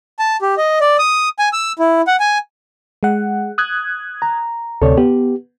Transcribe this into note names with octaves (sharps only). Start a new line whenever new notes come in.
A5
G4
D#5
D5
D#6
G#5
E6
E4
F#5
G#5
G#3 F#5
D#6 F#6 G#6
A#5
D2 C3 A4 C#5 D5
B3 G4